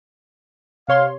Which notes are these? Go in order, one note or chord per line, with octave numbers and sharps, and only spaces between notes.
C3 C#5 F5 C6